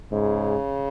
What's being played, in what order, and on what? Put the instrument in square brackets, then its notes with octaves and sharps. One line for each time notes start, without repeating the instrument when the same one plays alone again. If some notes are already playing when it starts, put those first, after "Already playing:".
[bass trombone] G#2 [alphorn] C#3